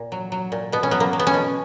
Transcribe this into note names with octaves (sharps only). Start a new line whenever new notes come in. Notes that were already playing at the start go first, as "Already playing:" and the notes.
Already playing: A#2
F#3
F#3
A#2
B2 B3
C#4
F#3 B3
A#3
F#3
B3
C#4
B2